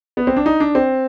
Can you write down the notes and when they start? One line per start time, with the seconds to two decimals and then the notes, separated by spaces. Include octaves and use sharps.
0.17 B3
0.27 C4
0.36 D4
0.46 D#4
0.60 D4
0.75 C4